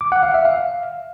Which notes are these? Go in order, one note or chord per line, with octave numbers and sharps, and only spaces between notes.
D6
F#5
F5
E5
F5